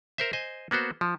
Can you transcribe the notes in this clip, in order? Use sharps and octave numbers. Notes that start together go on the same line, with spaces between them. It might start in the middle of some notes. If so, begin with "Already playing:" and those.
A#4 C5 E5
C5 D#5 G#5
A#3 B3 F#4 C5
F3